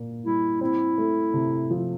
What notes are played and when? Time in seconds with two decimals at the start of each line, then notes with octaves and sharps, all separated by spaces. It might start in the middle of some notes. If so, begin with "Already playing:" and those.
Already playing: A#2 A#3
0.25 G3 E4
0.61 C4 E4
0.98 A3
1.34 C3
1.70 F3